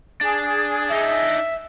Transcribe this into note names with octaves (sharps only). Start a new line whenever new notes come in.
D4 G#4
D4 D#4 E5